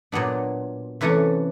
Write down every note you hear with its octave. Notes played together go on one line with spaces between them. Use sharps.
A#2 F#3 B3 D4
C3 E3 A3 C#4 B4